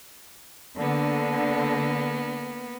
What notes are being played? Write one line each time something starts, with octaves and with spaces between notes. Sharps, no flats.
D3 A#3 B3